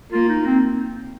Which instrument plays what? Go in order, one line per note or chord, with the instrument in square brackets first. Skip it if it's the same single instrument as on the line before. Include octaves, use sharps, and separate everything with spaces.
[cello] A#3 [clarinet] F4
[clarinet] D#4
C4